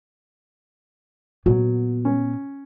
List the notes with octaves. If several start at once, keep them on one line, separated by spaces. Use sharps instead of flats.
A#2 F#3 B3
C#4